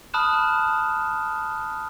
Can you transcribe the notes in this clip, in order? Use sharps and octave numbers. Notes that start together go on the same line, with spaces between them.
A5 B5 D#6 F6 F#6 E7